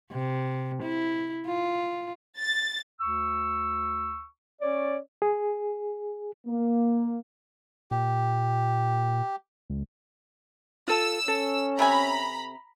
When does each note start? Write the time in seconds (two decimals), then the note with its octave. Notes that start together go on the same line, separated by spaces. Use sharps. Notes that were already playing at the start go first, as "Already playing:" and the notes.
0.12 C3
0.83 E4
1.46 F4
2.40 A6
3.01 D2 C#6 E6
4.62 C#4 C#5 D5
5.22 G#4
6.47 A#3
7.91 A#2 G4
9.70 C#2
10.88 F4 A4 E6
11.28 C#4 A4
11.79 C3 E5 G#5 A#5 B5